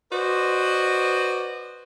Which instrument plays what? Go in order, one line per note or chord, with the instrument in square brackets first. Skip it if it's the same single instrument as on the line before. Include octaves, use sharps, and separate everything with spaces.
[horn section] F#4 B4 C5 D5 D#5